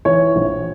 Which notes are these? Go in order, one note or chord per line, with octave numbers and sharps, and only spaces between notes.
E3 C#5
A#1